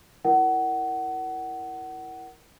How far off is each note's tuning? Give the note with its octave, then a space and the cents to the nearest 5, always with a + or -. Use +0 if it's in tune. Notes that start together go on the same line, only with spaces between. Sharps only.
E4 +0 A#4 +0 F#5 +25